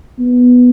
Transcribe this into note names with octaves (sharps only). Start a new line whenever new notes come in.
B3